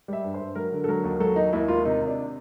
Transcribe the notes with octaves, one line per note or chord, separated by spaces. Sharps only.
G3 E5
G2
C5
G2
F#3 A#4
D3
A4
F#3 A#4
D#2
F#3 A4
D#2 D#4
D#2 E4
D#2 F4
C3 D#4
C3
D4